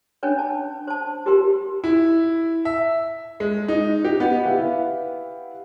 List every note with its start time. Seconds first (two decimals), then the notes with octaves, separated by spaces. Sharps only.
0.23 C#4 D4 B4 C#5
0.39 A5
0.87 C5 A5
1.26 F4 G4 A#4 B4 C6
1.84 E4
2.65 E5
3.40 G#3
3.68 D#4
4.05 G4
4.20 B3
4.45 E4 G4 B4 F5 F#5